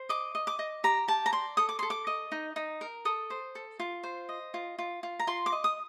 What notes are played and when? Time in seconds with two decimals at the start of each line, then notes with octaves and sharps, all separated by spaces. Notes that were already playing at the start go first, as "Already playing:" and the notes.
Already playing: C5
0.09 D#5 D6
0.35 D#5
0.47 D6
0.59 D#5
0.84 G4 A#5
1.08 G4 A5
1.26 A#5
1.33 D5 C6
1.57 A4 D#6
1.69 D6
1.79 A4 C6
1.90 D6
2.07 D#5
2.32 D#4
2.56 D#4
2.81 A#4
3.05 A4 D#6
3.30 C5
3.55 A4
3.79 F4
4.03 C5
4.29 D#5
4.54 F4
4.79 F4
5.03 F4
5.19 A#5
5.27 F4 C6
5.46 D6
5.52 D#5
5.64 D#6